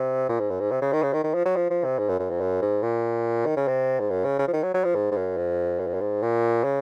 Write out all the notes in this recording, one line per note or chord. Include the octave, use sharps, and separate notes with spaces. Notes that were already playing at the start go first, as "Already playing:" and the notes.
Already playing: C3
A#2
G#2
F#2
G#2
C3
C#3
D#3
C#3
D#3
D#3
F3
F#3
F3
F3
C3
G#2
F#2
F#2
F2
F#2
G#2
A#2
D#3
C#3
C3
G#2
F#2
C#3
C#3
F3
D#3
F#3
F#3
F3
G#2
G#2
F#2
F2
F#2
F2
F#2
G#2
A#2
C#3